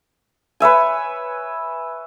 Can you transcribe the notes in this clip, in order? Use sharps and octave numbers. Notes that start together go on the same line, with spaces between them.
B4 C#5 E5 G#5